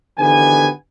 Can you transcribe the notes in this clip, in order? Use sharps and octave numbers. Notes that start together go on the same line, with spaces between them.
G#1 D3 E3 B3 G4 G#5